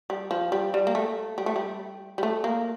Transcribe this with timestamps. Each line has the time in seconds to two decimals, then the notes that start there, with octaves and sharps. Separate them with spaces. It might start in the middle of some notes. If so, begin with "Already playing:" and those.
0.10 G3
0.31 F3
0.52 G3
0.74 G3
0.87 A#3
0.95 A3
1.38 G3
1.46 A3
1.56 G3
2.18 G3
2.23 A3
2.44 A#3